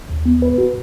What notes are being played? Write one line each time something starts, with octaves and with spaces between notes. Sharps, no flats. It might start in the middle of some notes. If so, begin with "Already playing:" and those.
D#2
B3
B4
F#4